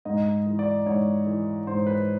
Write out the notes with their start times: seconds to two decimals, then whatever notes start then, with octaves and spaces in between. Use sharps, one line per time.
0.05 G#2 D#5
0.46 E3
0.59 D5
0.86 G#2 C#5
1.27 E3
1.67 G#2 C5
1.87 B4